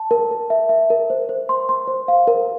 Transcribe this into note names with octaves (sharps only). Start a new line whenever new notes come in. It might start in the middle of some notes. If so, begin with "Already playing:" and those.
Already playing: A5
A#4
A#4
E5
E5
A#4
C5
C5
C6
C6
C5
F5
A#4